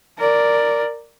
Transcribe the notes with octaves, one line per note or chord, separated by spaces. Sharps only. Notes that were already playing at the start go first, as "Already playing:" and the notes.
A#4 D5